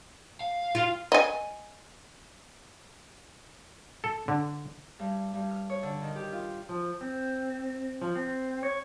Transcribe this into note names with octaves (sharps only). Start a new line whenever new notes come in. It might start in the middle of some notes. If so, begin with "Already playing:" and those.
F5
F4
D#5 G#5
A4
D3
G2
G2
F6
C#5
D3
D#3
G4
F4
F3
C4
F3
C4
C#5